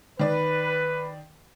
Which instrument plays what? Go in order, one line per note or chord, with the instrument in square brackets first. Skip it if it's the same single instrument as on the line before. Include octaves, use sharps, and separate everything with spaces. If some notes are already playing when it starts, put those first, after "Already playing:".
[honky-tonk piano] D#3 D5 [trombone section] B4